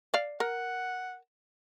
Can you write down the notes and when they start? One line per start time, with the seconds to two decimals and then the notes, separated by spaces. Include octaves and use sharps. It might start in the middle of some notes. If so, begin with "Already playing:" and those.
0.14 D5 F5
0.40 A#4 F#5